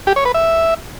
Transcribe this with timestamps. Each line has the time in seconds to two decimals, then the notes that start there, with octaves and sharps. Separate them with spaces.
0.07 G4
0.16 C#5
0.25 B4
0.34 E5